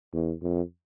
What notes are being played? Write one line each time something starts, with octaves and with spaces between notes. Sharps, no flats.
E2
F2